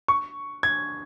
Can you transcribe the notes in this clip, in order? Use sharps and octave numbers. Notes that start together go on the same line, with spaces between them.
C#6
G#6